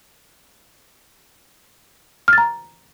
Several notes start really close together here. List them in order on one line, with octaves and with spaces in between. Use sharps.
F6 A6 A#5